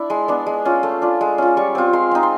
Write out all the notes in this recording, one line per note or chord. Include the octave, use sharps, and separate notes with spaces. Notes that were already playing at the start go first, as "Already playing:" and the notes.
Already playing: D4 E4
G#3 C6
B3 D4
G#3
C#4 F4
A3
D4 F4
G#3
C#4 F4
G3 C#6
C4 F4
G#3 C6
C4 D#4
C6